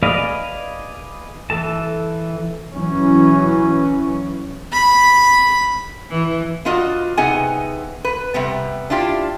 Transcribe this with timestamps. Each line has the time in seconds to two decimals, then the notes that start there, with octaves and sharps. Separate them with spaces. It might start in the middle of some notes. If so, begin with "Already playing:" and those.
0.03 G#4 B4 D5 D#5 F5
1.50 E3 A4 A5
2.73 E3 F#3 C#4
4.73 B5
6.10 E3
6.65 B3 D4 F4 F#4 D#5
7.17 C3 B3 D#4 G#4 F#5 G#5
8.04 B4
8.34 C3 G3 B3
8.90 D4 E4 F4 G4